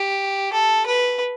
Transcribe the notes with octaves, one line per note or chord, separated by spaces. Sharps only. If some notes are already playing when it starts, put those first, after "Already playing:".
Already playing: G4
A4
B4